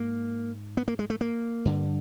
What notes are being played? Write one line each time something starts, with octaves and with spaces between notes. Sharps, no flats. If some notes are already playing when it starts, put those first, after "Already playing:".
Already playing: G#2 A#3
B3
A#3
G#3
A3
A#3
G2 D3